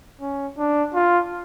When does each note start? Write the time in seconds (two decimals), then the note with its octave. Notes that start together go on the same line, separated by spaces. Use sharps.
0.21 C#4
0.58 D4
0.94 F4